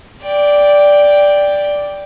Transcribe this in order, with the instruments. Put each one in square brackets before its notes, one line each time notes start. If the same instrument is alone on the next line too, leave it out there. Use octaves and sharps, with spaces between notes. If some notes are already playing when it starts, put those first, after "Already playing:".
[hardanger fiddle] D5 G5